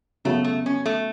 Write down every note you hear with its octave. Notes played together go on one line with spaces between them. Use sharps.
C#3 F#3 A3 B3
A3
C#4
A3